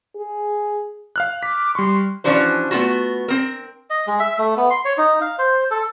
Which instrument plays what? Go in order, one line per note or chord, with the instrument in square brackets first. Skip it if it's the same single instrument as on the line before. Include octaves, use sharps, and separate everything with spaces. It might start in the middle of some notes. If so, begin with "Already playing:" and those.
[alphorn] G#4
[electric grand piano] F5 F6 F#6
[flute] D6 [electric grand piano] B6
[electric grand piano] G3 C#6 [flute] C6
[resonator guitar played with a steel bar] E3 F3 C#4 D4 F#4 C5
A3 B3 C4 F4 F#4
C4 A#4
[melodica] D#5
G#3
E5
A3
B3
C6
C#5
D#4
F5
C5
A4